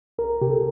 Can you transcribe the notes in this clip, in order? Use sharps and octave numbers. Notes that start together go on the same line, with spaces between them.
C2 A#4
C3 G4
A4